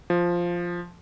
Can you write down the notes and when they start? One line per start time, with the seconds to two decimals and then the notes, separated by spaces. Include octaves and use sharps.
0.10 F3